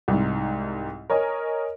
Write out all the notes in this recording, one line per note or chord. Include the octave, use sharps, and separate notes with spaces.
C2 G#2
A#4 C#5 D#5 G#5